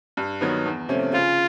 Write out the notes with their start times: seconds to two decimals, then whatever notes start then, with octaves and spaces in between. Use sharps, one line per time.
0.17 G2
0.41 D#3 F#3 B3
0.66 E2
0.89 C3 F3 A3 C#4
1.13 C#3 F4